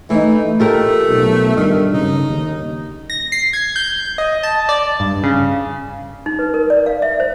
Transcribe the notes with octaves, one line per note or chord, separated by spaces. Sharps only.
E3 A3 D#4
A3 F4 G4 A#4
B1
G2 D#3
C#3 D#4
D#2
A#6
C7
G#6
G6
D#5
A5
D5
G2
C#3
D#4
B4
A#4
D5
F5
E5
C5